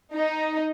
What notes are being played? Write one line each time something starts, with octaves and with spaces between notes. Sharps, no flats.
D#4